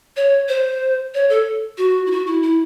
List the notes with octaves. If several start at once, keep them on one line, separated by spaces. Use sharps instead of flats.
C#5
C5
C#5
A4
F#4
E4
F#4
E4
E4